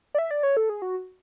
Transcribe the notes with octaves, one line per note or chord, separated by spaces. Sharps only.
D5
E5
D5
C#5
A4
G#4
F#4